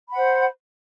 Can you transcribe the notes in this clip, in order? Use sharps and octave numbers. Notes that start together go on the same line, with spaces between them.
C5 F#5 B5